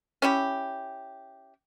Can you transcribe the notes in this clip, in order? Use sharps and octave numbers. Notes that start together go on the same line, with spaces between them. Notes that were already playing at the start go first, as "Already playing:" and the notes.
C#4 E4 G4